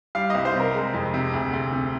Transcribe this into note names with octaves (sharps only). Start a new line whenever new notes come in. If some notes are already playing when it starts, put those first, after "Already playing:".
G3 F5
C2 D#5
C5
C3 A#4
G#3
F2
C3
D2
D2
C3